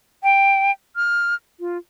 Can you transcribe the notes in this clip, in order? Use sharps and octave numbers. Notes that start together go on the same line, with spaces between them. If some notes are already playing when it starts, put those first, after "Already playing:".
G5
F6
F4